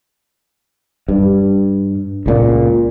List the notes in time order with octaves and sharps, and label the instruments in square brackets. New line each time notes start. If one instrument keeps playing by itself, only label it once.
[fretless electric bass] G2
C#2 A#2